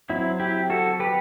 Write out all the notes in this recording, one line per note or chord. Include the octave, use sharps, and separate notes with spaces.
F#3 C4 E4
E4 G4
F#4 A4
G4 B4